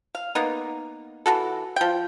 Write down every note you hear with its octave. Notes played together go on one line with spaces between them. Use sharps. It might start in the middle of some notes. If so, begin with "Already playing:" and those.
F5
A#3 B3 D#4
E3 F#4 A4
F3 G5